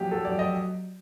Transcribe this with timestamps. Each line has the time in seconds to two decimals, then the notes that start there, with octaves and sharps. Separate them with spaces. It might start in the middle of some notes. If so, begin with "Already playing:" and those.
Already playing: A#1 F#3 G4
0.11 F#3 A4
0.25 D5
0.32 F#3
0.39 D#5